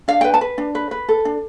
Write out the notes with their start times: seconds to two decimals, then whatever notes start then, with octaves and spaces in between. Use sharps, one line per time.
0.08 D4 F5
0.21 B4 G5
0.34 A5
0.41 B4
0.58 D4
0.75 B4
0.91 B4
1.09 A4
1.25 D4